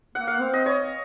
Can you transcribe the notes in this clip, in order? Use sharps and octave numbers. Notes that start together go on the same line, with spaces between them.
A#3 F#5
F5
C4
D#5
C#5